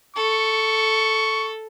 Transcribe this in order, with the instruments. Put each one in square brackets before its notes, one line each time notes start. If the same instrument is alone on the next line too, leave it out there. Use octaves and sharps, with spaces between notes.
[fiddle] A4 [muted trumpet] C#6